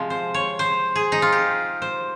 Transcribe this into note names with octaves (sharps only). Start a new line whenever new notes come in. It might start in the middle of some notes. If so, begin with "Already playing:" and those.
Already playing: C3 F3 G#3
C5
C#5
C5
G#4
D#4
F4
G4
C5